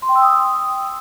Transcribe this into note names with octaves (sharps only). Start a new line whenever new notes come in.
C6
G5
E6
D#6